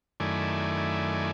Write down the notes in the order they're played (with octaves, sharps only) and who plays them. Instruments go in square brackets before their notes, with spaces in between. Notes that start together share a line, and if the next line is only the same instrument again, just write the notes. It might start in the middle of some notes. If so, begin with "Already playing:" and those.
[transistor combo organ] F#2 D#3 A3 E4 D5 G#5